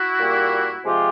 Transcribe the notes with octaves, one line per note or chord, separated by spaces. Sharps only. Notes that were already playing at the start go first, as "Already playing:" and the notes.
Already playing: E4 F#4
A#2 G3 A#3
C3 F3 G#3 F4 G4